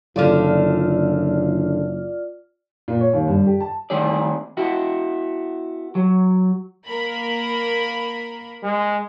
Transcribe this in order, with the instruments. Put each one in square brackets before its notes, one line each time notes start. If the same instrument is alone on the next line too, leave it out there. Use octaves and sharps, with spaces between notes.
[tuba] F#1 [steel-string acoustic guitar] D3 A3 [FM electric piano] F4 D5 F6
[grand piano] A#2
C#5
D#2
G2
G4
A5
[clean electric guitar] D#3 A3 C4 G#4 D5
B3 E4 F#4
F#3
[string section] A#3 A#4 B5
[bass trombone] G#3